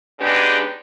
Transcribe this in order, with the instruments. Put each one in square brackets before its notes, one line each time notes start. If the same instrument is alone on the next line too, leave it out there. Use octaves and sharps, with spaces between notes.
[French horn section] C#3 G#3 B3 D4 D#4 G4